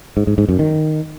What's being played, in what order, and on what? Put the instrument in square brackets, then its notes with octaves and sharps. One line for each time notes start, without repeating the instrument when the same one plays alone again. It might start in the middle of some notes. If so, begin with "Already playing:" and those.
[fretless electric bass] G#2
G#2
G#2
F#2
D#3